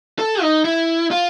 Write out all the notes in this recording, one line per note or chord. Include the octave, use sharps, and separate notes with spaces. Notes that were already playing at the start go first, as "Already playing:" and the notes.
A4
D#4
E4
F4